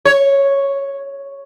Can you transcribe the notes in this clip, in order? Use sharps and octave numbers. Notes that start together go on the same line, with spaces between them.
C#5